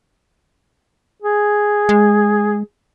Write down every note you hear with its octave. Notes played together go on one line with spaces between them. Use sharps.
G#4
G#3